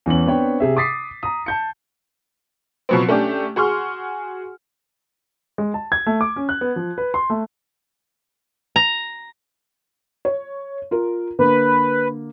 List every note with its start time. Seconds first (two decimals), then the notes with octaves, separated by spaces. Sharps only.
0.06 E2 E3 C#4 F#7
0.26 B3 C4 D4 B4 C#5 G5
0.60 C3 G#4 E5
0.77 D6 D#6 A6 B6 C7
1.23 A#5 D#6
1.46 A5 G6 C#7
2.89 B2 F3 F#3 B3 C4
3.08 A3 C#4 D4 G4
3.56 F#4 G#4 C6 C#6 F6
5.58 G#3
5.74 A5
5.92 G#6
6.06 A3
6.21 D6
6.36 C#4
6.49 F#6
6.61 B3
6.76 F3
6.98 B4
7.14 C6
7.30 A3
8.76 A#5
10.25 C#5
10.91 F4 A#4
11.39 D3 A#3 B4